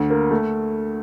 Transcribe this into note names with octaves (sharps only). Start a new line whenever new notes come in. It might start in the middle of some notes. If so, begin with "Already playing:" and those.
Already playing: D2
A#3
A3